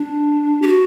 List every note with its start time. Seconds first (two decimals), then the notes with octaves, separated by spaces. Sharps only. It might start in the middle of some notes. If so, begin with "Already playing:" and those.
Already playing: D4
0.62 G4
0.67 F#4